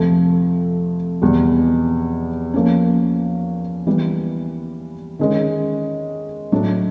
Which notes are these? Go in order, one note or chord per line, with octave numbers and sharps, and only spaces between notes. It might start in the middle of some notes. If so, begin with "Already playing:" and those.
Already playing: F2 C3 F3 A3
E2 B2 G3
F3 A#3 C#4
E3 G3 B3
D#3 G#3 C#4
A2 F#3 A3 D4